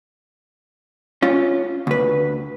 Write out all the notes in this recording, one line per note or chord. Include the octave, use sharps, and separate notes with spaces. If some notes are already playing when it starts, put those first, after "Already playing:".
C#4 F4
D2 B4